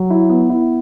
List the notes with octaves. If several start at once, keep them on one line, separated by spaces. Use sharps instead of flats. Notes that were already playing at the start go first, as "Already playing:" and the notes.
Already playing: F#3
E4
B3
E4